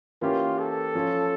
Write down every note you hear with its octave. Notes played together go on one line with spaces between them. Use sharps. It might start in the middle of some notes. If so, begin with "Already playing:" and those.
E3 A#3 C#4 F4 G4 A#4
A4
F3 C#4 F4 C#5